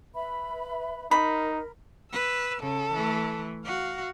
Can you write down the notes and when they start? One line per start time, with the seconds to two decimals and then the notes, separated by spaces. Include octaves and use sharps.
0.14 B4 E5 B5
1.11 D#4 A#4 B5
2.12 B4 E6
2.63 C#3 A4
2.94 E3 A3
3.65 F#4 F5